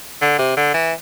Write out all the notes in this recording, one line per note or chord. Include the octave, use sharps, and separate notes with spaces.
D3
C3
D3
E3